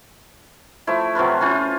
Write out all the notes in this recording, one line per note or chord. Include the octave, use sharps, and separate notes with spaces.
F3 A3 E4
C3 F#3 F4 B4
C#4 E4 F4 C5